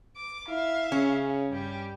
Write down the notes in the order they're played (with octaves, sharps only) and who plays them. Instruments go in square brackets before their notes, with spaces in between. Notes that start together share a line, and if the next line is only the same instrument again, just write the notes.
[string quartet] D6
[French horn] E4 [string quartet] E5 F5
[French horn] C#3 [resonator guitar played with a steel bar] C#4
[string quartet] G2 G3 G4